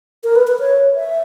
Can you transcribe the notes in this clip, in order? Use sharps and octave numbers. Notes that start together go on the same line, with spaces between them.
A#4
B4
B4
C#5
E5